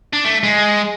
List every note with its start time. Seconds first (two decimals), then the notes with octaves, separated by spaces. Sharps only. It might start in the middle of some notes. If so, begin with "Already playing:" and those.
0.13 D4
0.25 A3
0.43 G#3